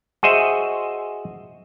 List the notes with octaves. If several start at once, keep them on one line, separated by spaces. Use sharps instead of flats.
F#4 G#4 C5 D#5 E5